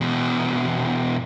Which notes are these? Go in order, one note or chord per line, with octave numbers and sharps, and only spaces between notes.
E2 B2